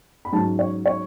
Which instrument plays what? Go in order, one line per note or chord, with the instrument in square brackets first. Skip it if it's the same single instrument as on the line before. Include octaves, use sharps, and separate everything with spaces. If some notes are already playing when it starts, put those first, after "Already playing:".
[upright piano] B5
G#2 F#3 C#4 A5
C#5
C#5